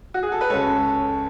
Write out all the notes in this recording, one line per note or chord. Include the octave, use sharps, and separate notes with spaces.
F#4
G#4
A4
B4
C#2 C#3 G#3 A4 C#5